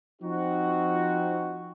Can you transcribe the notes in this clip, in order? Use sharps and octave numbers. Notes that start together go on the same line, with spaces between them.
F3 C4 D#4 F#4